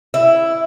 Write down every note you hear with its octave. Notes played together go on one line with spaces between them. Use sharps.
E4